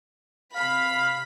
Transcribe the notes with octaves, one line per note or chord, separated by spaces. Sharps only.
C3 F5 B5 B6